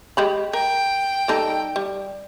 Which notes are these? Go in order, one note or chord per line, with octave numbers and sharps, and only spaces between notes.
G#3 G4 B5
A#4 G5
G3 D#4 A4
G3